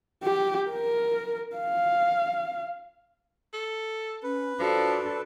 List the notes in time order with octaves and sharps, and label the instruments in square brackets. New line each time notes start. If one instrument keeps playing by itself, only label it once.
[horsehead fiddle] G4
A#4
F5
[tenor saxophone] A4
[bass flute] C#4 [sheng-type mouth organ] B4
[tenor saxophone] F3 [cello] D4 A4 [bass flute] F#4